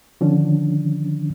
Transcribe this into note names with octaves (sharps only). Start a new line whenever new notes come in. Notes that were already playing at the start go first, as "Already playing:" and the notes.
D3 D#3 F3 C#4 D4